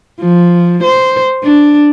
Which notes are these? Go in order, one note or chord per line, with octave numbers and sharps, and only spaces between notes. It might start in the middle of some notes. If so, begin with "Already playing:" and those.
F3
C5
D4